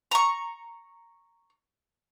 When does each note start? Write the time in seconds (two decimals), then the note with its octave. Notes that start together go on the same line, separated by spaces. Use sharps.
0.11 A#5 C#6